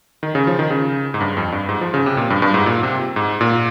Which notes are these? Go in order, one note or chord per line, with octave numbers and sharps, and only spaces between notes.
D#3
C#3
F3
D#3
C#3
G#2
G2
F2
G2
G#2
F3
C#3
C3
A#2
G2
G2
G#2
A#2
C3
G#2
A#2